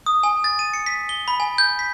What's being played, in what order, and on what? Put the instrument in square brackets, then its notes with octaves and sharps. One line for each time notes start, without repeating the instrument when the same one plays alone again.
[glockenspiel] D#6
G#5
A6
D#7
C#7
B6
G7
B5
G#5
G6
B6